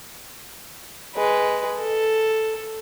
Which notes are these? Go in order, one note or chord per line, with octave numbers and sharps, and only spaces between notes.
G#3 B4
A4